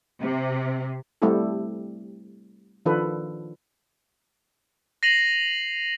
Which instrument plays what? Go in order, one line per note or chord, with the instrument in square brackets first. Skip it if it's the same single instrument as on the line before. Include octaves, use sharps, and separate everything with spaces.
[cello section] C3
[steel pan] G3 A3 C4 E4 G4 A4
D#3 F3 D4 F4 A4 B4
[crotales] A#6 C7 D#7 F7 F#7